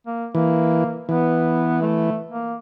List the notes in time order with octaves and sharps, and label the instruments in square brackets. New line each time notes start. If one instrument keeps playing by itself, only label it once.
[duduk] A#3
[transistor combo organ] E3 [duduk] A#3
[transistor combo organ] E3 [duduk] B3
[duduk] A3
A#3